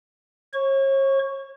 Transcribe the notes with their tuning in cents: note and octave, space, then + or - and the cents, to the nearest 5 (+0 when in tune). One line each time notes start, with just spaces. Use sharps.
C#5 -40 C#6 +5